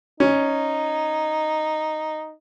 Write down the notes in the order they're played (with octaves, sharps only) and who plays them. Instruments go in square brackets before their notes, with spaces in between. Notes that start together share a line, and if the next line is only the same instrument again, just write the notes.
[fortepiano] C#4 [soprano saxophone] D#4